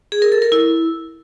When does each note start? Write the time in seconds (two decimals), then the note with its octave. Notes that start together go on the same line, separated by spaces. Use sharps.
0.12 G#4
0.22 A#4
0.32 A4
0.42 A#4
0.52 E4